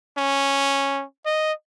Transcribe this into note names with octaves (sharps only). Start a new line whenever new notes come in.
C#4
D#5